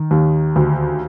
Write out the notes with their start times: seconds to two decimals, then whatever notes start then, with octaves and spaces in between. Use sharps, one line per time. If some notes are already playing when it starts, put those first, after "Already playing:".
Already playing: D#3
0.11 D#2
0.56 D2